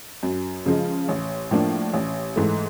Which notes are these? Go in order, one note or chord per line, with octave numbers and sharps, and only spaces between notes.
F#2
C#3 F3 G#3
A1
A2 F3 A#3 D4
A1
G#2 E3 A3